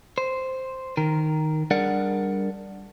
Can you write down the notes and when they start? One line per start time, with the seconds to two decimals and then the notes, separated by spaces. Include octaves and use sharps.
0.18 C5
0.97 D#3 A#4
1.71 G3 D4 G#4 A#4 D5 F#5